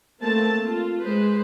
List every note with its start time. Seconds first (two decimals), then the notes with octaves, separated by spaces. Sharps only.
0.21 A3 A#3 C4 A5
0.64 F4
1.02 G#3 B4 C5